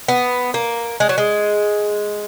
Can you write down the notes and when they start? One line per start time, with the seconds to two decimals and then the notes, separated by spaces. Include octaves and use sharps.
0.08 B3
0.54 A#3
1.00 G#3
1.09 F#3
1.18 G#3